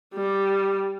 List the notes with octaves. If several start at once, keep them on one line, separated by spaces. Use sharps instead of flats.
G3